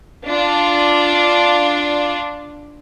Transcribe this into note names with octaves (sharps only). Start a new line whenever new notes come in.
D4 F4